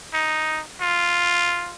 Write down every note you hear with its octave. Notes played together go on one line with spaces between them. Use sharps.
D#4
F4